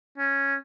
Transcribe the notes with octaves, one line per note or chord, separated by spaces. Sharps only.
C#4